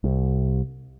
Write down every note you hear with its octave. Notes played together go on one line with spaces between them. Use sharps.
C2